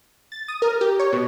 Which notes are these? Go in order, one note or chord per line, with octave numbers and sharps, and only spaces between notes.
A6
D#6
A#4
G4
C#5
B2